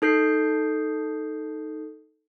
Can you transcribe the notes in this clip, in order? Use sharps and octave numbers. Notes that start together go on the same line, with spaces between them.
D#4 A4 G6 C7